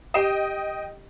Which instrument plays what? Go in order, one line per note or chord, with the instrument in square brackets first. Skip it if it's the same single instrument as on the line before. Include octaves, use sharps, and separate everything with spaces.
[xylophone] G4 C7 E7 [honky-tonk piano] D#5 G5